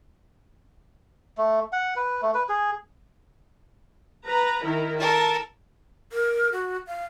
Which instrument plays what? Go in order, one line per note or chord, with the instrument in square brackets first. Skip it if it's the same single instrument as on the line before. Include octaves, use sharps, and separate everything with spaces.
[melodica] A3
F#5
B4
A3
B4
G#4
[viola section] B4 A#5
D#3 E4 A#4
[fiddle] A4 A#4 [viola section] A5
[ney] A#4
F#4
F5